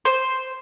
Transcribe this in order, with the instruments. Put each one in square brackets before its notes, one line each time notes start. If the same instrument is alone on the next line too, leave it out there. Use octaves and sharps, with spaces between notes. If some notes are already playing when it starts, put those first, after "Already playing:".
[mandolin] C5